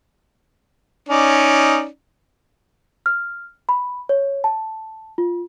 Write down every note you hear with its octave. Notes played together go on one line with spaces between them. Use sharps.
C#4 D#4 D5
F6
B5
C#5
A5
F4